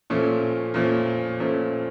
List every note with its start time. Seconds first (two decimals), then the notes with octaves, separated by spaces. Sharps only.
0.10 A#2 F3 A3 C#4
0.74 A#2 F3 A3 C#4
1.40 A#2 F3 A3 C#4